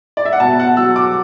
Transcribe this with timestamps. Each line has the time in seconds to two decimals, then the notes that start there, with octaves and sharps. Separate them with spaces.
0.17 D5
0.25 E5
0.33 F#5
0.40 B2 A5
0.60 F#5
0.77 F#3 E6
0.96 D6